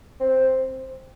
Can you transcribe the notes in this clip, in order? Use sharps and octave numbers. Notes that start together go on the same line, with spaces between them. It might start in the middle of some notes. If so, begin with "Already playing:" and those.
C4